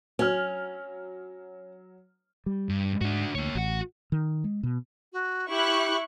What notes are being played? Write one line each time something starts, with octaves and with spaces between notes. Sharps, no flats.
F#3 C#4 F6
G3
G2
G#2 D4 F#4
D2 A#3 C#5
A1 F#4 F#5
D#3
G#3
B2
F#4
E4 G4 C#6 F#6